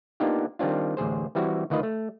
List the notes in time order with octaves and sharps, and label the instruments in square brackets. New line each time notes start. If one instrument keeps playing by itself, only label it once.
[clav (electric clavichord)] A#3 B3 D4 D#4 F4 G4
D#3 G3 C4 D4 F4
A1 D2 G#4 C5
E3 G3 C4 E4 F#4
D2 D#3 F4 B4 D#5
A3